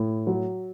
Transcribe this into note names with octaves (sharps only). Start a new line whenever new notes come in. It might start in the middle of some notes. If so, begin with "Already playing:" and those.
Already playing: A2
F#3